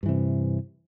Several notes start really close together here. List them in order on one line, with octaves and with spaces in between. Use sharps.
G2 E3 C3